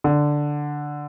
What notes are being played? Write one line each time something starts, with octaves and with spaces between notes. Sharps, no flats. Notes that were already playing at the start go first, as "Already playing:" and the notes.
D3